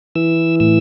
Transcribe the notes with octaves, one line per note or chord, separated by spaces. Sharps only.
E3 E6
A2 E6